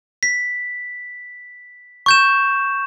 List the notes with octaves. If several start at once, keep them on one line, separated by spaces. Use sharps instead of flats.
B6
C#6 G6 E7